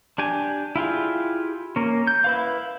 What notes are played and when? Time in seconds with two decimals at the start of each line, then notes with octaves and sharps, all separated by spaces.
0.18 D4 G4 G#5
0.76 E4 F4 G4 G#4
1.76 A#3 C#4
2.07 G6
2.24 E4 B4 F5